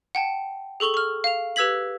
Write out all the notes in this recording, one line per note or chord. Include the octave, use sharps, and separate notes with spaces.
F#5 G5 A5
G#4 A4 C#6 F7 G7
C#6 F6
F5 F7
G4 B4 E6 G#6 B6 F#7